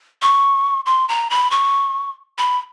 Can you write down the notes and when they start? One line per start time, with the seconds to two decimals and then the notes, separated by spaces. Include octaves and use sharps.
0.22 C#6
0.86 C6
1.09 A#5
1.31 B5
1.51 C#6
2.38 B5